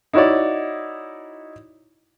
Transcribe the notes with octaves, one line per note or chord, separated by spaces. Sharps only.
D#4 E4 F#4 C#5 D5